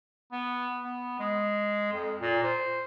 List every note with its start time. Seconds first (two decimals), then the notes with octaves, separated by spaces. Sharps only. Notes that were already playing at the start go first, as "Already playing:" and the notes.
0.32 B3
0.83 B3
1.19 G#3
1.92 F2
2.21 A#2
2.43 C5